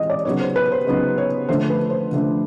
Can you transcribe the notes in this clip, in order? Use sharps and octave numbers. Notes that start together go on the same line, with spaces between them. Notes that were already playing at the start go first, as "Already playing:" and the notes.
Already playing: E3 G#3 C4 D#5
D5
C#3 F#3 B3 D#4 C#5
C5
B4
C5
C#3 F#3 B3 D#4
C#5
D3 F3 A3 D4 C5
B4
C5
D3 F3 A3 D4